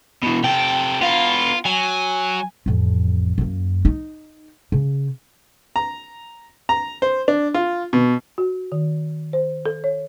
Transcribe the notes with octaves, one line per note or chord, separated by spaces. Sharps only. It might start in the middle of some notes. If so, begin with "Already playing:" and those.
B2 E3
C3 A4 G5
B3 F4 F5
F#3 G#5
A1 F2
F#2 A#3
D#4
C#3
A#5
A#5
C5
D4
F4
B2
F#4
D#3
C5
A4
C#5